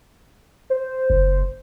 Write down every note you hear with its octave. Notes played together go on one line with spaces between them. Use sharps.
C5
F#1